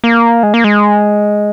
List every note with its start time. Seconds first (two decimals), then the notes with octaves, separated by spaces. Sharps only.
0.04 A#3
0.43 G#3
0.54 A#3
0.64 G#3